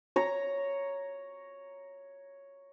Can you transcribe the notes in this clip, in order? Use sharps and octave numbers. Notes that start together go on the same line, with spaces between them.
C#5 A#5